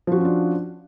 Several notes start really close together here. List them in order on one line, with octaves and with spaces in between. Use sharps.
F3 F#4 C#4 F4 D4